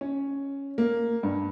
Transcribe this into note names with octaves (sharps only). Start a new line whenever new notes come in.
C#4
A#3
G2